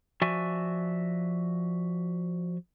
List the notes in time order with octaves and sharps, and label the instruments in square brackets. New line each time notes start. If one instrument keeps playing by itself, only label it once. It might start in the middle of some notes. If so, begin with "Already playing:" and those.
[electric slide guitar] F3 F#4 D5 E5 G#5